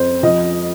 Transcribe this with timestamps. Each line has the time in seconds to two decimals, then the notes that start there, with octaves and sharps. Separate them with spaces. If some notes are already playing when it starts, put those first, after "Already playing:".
Already playing: F2 C5
0.23 F3 D#5